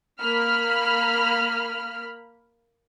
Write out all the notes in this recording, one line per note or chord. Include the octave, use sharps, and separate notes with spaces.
A#3 B5 F6